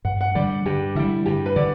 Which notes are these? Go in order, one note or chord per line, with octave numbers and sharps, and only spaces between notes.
G2 F#5
F#5
D3 G3 D5
G2 G4
D3 G3 E4
G2 G4
B4
D3 D5